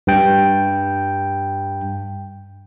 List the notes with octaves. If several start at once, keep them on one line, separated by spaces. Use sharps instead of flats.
G2 G5